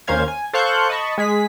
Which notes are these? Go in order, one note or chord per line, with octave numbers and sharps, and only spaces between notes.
D#2 A#3 C#4 C5 F5 G#6
G#5
A4 C5 F5 C#6 F#6 G6
D#5 A5 B5 C#6
G#3 G#4 B6